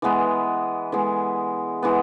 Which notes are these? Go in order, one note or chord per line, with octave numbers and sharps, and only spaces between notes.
E3 G#3 B3
E3 G#3 B3
E3 G#3 B3